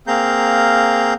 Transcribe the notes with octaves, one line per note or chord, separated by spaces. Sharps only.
A#3 C4 G#4 F5 A#5 G6